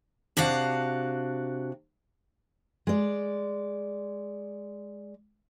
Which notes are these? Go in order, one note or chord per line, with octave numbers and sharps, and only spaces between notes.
C3 D4 F#4 F5
G#3 D5